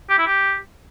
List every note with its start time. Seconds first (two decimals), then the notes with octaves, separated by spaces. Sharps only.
0.10 G4
0.18 E4
0.27 G4